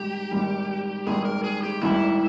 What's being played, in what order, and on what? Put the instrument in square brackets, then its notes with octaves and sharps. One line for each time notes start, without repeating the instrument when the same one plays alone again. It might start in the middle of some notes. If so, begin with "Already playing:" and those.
Already playing: [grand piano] G#1 G#2 G3 [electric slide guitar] G4
[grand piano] G#1 G#2 G3
[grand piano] G#1 G#2 G3 [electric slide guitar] G#4
[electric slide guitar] A#4
G#4
G4
[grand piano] G#1 G#2 G3 [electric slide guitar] E4